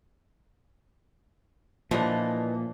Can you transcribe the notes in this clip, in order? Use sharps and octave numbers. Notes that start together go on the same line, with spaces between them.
A#2 E3 F3 D4 D#5